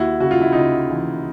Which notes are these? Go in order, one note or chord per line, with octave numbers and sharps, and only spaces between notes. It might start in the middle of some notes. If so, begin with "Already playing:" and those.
Already playing: D#2 E4 F#4
C#3 F#4
F4
E4
C#3 D#4 F4
E3